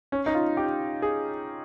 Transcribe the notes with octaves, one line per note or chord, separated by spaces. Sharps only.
C#4
D#4
F4
G4
G#4